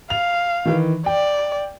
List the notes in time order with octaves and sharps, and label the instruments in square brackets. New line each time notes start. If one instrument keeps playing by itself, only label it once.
[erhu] F5 [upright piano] F7
[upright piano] D#3 E3
[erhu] D5 [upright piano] G5